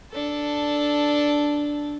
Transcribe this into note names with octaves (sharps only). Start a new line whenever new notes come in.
D4 A4